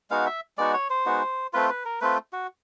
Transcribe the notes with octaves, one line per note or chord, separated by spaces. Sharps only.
G#3 B3 D#4 F#4 F5
E5
G#3 B3 D#4 F#4 D5
C#5
C5
G#3 B3 D#4 F#4
A3 C4 F4 B4
B4
A#4
A3 C4 F4 B4
F#4